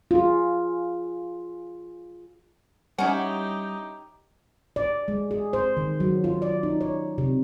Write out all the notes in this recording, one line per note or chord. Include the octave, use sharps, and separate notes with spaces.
F4 G#4
G3 C#4 D#4 E4 G4 F#5
D5
G#3
G#4
C5
D#3
F#3
F4
D5
D#4
C#5
C3